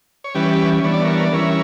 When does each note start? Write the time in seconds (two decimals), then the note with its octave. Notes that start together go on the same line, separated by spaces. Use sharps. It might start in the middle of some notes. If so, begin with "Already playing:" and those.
0.24 C#5
0.35 E3 G3 C#4 G4 B4
0.83 E3 G3 B3 D4 C#5
0.94 D5
1.04 A#4 C#5
1.25 D5
1.32 E3 G3 C#4 E4 A#4 C#5